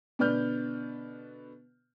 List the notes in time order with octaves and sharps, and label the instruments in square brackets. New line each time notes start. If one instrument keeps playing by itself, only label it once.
[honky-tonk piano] B2 D3 B4 D5 F6 G6